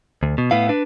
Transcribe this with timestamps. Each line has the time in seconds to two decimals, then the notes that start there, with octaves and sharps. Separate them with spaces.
0.23 D2
0.38 B2
0.51 A2 B3 E4 F5
0.69 D4 B4